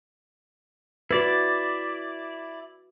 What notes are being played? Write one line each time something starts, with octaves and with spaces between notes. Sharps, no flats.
E4 F#4 B4 D5